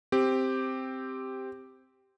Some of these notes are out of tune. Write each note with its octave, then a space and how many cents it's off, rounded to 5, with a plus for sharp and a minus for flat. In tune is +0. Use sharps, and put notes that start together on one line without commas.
C4 +0 G4 +0